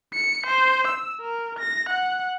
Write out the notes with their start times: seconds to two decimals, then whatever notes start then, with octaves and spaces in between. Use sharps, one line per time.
0.14 C#7
0.46 C5
0.88 E6
1.21 A#4
1.59 A#6
1.89 F#5